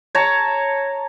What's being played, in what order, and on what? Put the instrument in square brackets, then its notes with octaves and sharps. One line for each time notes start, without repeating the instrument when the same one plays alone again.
[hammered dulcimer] C#5 A5 A#5